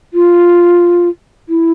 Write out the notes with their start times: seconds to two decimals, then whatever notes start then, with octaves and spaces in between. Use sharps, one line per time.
0.14 F4
1.49 E4